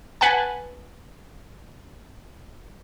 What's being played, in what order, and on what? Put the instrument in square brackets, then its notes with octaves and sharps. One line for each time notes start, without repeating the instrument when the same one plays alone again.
[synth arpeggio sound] B4 F#5 G#5 A5